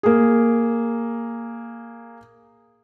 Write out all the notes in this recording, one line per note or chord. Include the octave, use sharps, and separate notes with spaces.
A#3 G#4